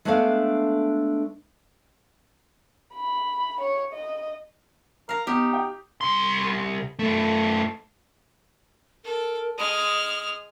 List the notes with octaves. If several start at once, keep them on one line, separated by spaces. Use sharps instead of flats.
G#3 A3 B3 D4 A4 F5
B5
C#5
D#5
A#4 F5 A#5
B3 D#4 G4
G5
C2 C6
F#2 A3
A4 A#4
G#3 D#6 F6